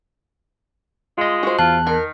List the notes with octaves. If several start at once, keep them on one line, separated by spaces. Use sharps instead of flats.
G#3 F4 D#5
F#4 C5
E2 F4 A5 F#6
D#3 A#4